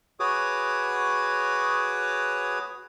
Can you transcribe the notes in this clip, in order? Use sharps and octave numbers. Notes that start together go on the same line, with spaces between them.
F#4 G#4 B4 C#5 D6 D#6